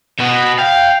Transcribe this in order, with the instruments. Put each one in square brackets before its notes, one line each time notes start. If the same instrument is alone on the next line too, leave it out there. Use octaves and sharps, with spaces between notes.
[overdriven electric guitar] B2 B3
[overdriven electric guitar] F5 [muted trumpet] G5